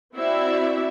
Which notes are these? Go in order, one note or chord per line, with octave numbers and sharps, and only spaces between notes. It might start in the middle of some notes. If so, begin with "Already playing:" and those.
C4 E4 F#4 D5 E5